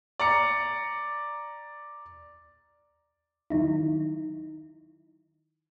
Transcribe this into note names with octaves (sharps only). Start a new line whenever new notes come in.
D5 A#5 C#7
D#3 F#3 D#4 E4